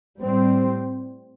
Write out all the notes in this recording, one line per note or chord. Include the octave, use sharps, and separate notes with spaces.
A2 G3 C4